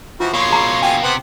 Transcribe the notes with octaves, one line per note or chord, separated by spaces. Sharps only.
E3 F3 F4 F#4
B2 A#3 C#5 C6
G#4 A#5 B5
F4 G5 G#5
C3 B3 C5 F#5